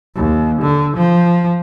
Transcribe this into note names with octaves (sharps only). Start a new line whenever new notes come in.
D#2
D3
F3